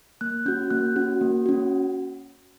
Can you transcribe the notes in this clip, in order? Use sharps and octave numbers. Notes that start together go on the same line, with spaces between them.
A#3 F#6
C#4 F#4 G6
A#3 F#6
C#4 F#4
A#3
C#4 F#4